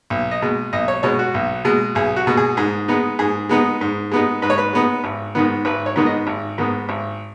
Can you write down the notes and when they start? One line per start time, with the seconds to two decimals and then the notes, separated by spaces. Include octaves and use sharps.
0.10 B1
0.31 D#5
0.42 B2 G#3
0.73 B1 D#5
0.88 C#5
1.03 B2 G#3 C#5
1.19 F#4
1.34 B1
1.65 B2 G#3
1.95 B1 G#4
2.16 F#4
2.27 B2 G#3
2.37 G#4
2.57 G#2 G#4
2.88 G#3 B3 D#4
3.19 G#2 G#4
3.49 G#3 B3 D#4
3.81 G#2
4.12 G#3 B3 D#4
4.42 G#2 B4
4.50 C#5
4.58 B4
4.73 G#3 B3 D#4
5.04 G#1
5.35 G#2 D#3 B3
5.65 G#1 B4
5.86 C#5
5.96 G#2 D#3 B3
6.06 D#5
6.27 G#1
6.58 G#2 D#3 B3
6.89 G#1